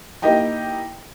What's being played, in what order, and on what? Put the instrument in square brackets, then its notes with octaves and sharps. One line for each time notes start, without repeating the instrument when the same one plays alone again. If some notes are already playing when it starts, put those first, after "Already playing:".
[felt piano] A#3 D#4 E4 G4 D#5 G5